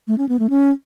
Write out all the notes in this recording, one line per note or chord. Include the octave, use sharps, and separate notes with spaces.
A3
C#4
B3
A3
C#4